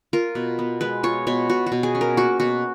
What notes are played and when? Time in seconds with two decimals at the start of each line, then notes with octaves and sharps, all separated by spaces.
0.13 F4 A#4
0.35 B2
0.59 B3
0.81 G#3 B4
1.03 F4 C#5
1.27 B2 C#5
1.50 B2 F#4
1.66 F#4
1.72 B2
1.83 G#4
1.95 C#4
2.01 A#4
2.17 A#3 F#4
2.40 B2 F#4